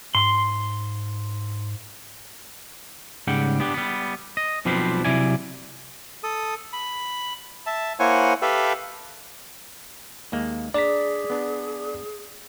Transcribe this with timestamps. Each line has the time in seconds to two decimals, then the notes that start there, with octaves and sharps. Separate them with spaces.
0.15 G#2 C6
3.27 G#2 C#3 G3 F#5 G5
3.60 B3 D4 G4
3.74 G3 B3
4.37 D#5
4.65 B1 F3 G3 C4 B4 C5
5.05 C3 F#3 E4 D5 G#5
6.24 A4 D#6
6.73 B5
7.66 E5 A5
8.00 A#3 E4 C5 C#5 F#5 G#5
8.42 G4 A4 B4 E5 F5 G5
10.32 D#2 G#3 A#3
10.74 D4 G#4 D5 A5 A#5 B6
11.30 B3 D4